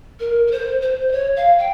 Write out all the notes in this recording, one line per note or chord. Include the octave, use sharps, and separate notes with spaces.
A#4
A#4
C5
C5
D#5
C#5
F5
G5